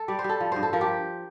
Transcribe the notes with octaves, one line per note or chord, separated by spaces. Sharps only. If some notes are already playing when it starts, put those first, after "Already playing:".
Already playing: A4
G3 D5
C5
G3
A4
F3
G2 C5
A4
F3 A#4
G4